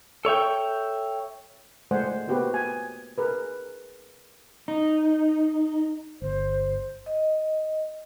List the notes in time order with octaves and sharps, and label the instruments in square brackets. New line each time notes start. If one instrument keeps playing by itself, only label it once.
[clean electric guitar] A4 C#5 E5 G5
[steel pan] G#3 A3 C5 D5 F#5 G#5
A#3 B3 F#4 G4 B4 C5
G#5
G#4 A#4 B4
[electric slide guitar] D#4
[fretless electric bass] G1 [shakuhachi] C5
[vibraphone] D#5